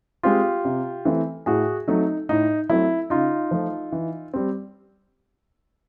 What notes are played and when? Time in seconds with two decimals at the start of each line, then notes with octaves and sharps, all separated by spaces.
0.23 G#3 C4 F4 G4
0.65 C3
1.05 E3 A3 C4
1.46 A2 F#4 G#4
1.88 F#3 A3 C4 D#4
2.29 A2 D#4
2.69 F#3 A3 C4 E4
3.10 C#3 D#4 F4
3.51 F3 A3
3.92 E3
4.34 G3 C4